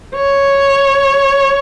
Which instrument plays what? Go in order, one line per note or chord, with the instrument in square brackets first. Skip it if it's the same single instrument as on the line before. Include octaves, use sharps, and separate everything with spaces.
[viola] C#5